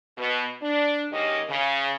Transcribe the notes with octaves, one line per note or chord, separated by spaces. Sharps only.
B2
D4
G#2 D#3 A#3 C#4 G4 D#5
C#3